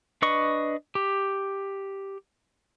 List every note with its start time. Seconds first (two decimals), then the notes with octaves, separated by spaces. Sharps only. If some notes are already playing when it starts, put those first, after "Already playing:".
0.22 D4 B4 D#5 C#6
0.95 G4